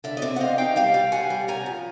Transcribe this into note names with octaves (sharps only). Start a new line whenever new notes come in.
D3 D5 E5
D#5
C4 D5 E5
F#5
C4 D#5 F5
D#4 F5 G5
G3 F5 G5
G3
G3 F#5 G#5
G3
C#4 G#5 A#5
F3